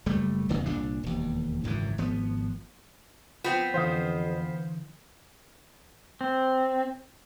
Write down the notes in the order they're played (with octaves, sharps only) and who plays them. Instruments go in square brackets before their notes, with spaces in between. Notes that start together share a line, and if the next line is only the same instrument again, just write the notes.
[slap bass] F#1 G3 A3
D1 G1 E2 C#3
C2 A#2 D4
E1 D#2
G#1 C#2 F#2 E3
G#1 F3 B3
[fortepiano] F3 [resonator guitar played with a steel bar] B3 C4
[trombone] F2 [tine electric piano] D3 E3 [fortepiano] C5 F5 D#6
[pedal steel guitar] C4